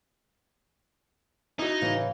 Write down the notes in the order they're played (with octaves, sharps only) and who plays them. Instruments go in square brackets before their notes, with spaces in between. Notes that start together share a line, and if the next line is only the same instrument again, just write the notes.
[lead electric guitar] D#4 [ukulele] E4 F#4
[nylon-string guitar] A2 C#3 E3